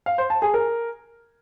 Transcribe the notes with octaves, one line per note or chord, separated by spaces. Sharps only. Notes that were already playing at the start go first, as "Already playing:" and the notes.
F5
C5
A5
G#4
A#4